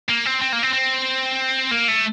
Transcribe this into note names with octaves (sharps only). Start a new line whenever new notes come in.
A#3
C4
C4
A#3
C4
C4
A#3
A3